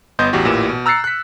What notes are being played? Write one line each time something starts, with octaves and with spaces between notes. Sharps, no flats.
G1 B3 D#5 C6 G6
A1 E2 F#4 G4
A1 A#2 E3 G4 E7
B2
A#5 E6 F#6 A6 C7 C#7
F#6 B6